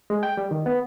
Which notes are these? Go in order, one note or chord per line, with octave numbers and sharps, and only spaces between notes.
G#3
G5
G3
D#3
B3